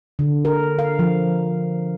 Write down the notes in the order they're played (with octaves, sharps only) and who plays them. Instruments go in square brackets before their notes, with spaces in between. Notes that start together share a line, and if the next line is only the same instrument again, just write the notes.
[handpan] D3
A#4
F5
F3